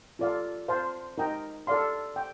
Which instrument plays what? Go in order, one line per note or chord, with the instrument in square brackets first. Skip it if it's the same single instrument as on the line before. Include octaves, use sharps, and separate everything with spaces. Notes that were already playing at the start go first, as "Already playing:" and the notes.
[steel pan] F4 A4 D5 F5
C5 F5 A5 C6
D#4 A#4 D#5 G5 A#5
A4 D5 F5 C6
G5